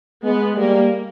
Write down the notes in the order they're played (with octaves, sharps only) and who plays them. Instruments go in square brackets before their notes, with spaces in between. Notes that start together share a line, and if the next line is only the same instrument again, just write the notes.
[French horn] G#3 [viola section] B3
[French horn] G3 [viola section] A#3